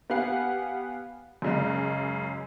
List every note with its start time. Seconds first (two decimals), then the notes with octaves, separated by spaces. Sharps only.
0.10 B3 G4 B4 F5 F#5 G#5
1.42 F#2 C#3 G#3